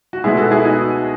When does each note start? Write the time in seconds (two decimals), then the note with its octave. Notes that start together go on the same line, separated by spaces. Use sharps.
0.13 F#4
0.24 B2 G#3 B3 E4 G#4
0.37 F#4 A4
0.51 E4 G#4
0.64 D#4 F#4